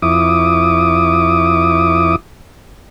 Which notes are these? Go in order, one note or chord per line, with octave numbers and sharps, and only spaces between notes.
F2 E4 D6 D#6